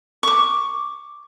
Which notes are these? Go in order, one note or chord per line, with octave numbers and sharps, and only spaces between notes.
C#6 D6